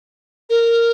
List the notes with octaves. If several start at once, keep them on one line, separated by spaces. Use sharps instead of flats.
A#4